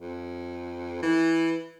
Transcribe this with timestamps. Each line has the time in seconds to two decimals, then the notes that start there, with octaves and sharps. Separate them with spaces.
0.01 F2
1.02 E3